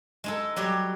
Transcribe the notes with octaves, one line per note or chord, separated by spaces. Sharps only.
G#3 D#4 A4
F#3 G3 G4